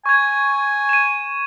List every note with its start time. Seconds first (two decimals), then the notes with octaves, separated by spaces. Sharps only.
0.06 G#5 C#6 G#6
0.89 D#7 E7